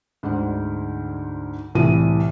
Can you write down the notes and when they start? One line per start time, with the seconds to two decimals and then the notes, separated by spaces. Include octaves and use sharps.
0.23 D2 G#2 D3
1.75 C2 A2 E3 E4 D#7